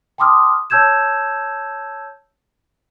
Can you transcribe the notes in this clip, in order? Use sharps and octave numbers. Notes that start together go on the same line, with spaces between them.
G5 A5 C6 D6 D#6 F6
C#5 A5 E6 G6 G#6 E7